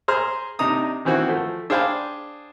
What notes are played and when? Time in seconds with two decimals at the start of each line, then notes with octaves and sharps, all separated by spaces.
0.08 G#4 C5 A#5 C6 F6
0.59 C3 D4 D#4 A#5 D#6
1.05 D#3 E3 C4 F#4
1.28 F3 A3
1.70 D4 G#4 C5 F5 G5 B5